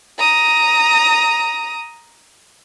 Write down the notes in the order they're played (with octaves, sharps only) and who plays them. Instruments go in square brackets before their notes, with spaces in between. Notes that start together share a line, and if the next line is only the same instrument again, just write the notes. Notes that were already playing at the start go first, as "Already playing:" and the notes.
[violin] A#5 D#6